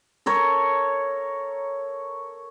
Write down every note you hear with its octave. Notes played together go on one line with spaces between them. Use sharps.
A4 A#4 C#5